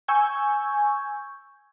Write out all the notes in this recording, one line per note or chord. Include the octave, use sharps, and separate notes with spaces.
G#5 C#6 E6 G6 G#6